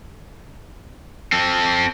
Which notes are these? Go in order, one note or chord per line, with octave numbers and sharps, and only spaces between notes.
C4 A4